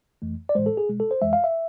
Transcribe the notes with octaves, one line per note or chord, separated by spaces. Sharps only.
F2 E3 A3
D5
A2 E3 G#3 C5
A4
G#4
B2 G#3
A4
C5
F2 E3 G#3 E5
F5
E5